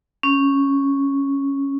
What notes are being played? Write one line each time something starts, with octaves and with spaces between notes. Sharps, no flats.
C#4